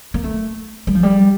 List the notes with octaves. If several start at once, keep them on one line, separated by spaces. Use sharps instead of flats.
A#3
A3
G3
F3
G3